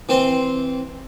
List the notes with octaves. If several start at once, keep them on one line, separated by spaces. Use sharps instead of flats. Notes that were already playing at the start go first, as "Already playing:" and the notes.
E3 C4 C5